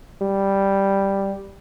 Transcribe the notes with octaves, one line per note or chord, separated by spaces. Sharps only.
G3